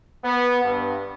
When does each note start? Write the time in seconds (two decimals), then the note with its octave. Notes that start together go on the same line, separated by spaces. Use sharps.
0.24 B3
0.64 G2